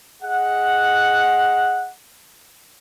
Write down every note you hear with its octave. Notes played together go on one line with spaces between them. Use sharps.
G#4 D#5 F#5